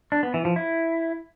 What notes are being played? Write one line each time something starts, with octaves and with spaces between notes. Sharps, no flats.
D4
B3
E3
F3
E4